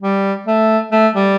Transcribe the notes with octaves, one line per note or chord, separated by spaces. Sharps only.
G3
A3
A3
G3